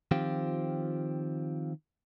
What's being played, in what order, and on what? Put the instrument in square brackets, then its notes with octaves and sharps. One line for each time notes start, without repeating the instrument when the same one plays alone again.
[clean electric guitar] D#3 F3 C4 F4 G4